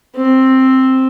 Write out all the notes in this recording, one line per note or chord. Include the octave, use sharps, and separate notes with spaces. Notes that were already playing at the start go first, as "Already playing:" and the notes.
C4